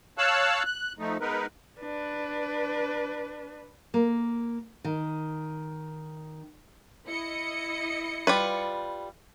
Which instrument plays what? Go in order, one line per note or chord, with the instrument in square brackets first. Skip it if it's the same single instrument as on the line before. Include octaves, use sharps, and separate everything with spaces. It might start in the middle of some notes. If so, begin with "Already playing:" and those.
[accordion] C#5 F5 A5 E6 F#6
F#6
F3 A3 D#4
G#3 B3 D#4 A#4 B4
[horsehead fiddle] D4 B4
[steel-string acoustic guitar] A#3
D#3
[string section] E4 D#5 C#7
[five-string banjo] G3 F4 B4